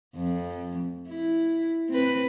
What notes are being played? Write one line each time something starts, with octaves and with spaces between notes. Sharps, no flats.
F2
E4
C4 B4